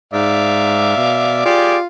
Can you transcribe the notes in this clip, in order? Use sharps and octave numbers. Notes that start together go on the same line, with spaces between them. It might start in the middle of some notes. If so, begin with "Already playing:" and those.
G#2 D5 E5 F5
B2
F4 G4 G#4 D5